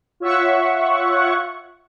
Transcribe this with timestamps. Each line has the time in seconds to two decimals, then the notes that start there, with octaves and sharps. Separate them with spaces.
0.20 F4 C#5 E5 F#5 C#6